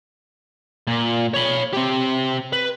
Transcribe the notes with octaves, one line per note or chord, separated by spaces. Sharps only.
A#2
C#5 B5
C4 G4
B4